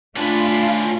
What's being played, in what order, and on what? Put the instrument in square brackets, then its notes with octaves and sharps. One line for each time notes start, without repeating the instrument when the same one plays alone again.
[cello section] A3 F4 [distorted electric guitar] C#4 B4 [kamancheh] D4 B5